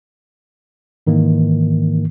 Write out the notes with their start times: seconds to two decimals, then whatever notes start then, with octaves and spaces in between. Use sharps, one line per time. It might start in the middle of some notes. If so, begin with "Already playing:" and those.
1.07 G#2 D#3 E3 A#3